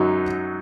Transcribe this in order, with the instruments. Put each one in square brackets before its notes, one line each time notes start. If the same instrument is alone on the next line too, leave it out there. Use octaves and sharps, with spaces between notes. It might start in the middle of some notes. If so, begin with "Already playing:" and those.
Already playing: [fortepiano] F#2 F#3 D#4 F#4